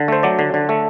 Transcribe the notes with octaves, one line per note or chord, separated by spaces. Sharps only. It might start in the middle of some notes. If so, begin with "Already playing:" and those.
Already playing: D3
A3 C5
F#3 D5
D3
D3
A3